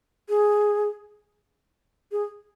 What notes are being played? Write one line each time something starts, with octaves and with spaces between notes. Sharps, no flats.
G#4
G#4